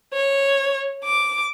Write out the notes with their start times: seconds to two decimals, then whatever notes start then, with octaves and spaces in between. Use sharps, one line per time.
0.13 C#5
1.04 D6